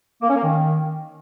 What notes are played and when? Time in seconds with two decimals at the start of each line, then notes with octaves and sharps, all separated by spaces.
0.22 A#3
0.29 C#4
0.36 A#3
0.43 D#3